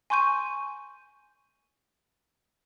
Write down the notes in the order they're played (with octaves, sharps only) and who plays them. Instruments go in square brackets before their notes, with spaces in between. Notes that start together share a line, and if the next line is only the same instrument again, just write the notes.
[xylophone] G#5 C6 C#6 G6 D#7